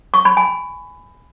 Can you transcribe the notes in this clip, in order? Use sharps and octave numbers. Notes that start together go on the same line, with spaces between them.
C#6
B5
G#5